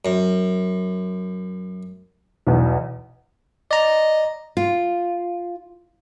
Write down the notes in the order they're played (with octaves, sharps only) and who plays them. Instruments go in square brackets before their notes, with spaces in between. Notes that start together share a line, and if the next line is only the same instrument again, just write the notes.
[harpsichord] F#2
[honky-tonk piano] B1 E2
[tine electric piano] D5 A#5 [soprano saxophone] D#5
[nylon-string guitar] F4